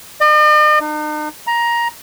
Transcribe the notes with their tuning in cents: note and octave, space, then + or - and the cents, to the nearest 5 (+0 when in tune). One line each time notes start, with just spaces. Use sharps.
D#5 -45
D#4 -45
A#5 +15